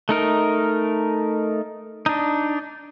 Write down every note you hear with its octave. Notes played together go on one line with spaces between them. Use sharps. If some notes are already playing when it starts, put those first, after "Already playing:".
A3 D#4 A#4
D4 D#4